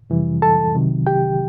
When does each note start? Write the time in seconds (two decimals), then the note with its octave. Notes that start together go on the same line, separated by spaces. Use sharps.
0.10 F2 C3 E3 G3
0.42 A4 A5
0.75 C2 C3 D#3 F#3
1.07 G4 G5